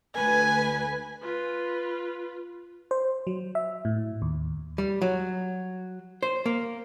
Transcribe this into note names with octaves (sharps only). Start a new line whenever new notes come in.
D2 B4 G#5
F4 B4
C5
F#3
E5
A2
D#2
G3
F#3
C5
A#3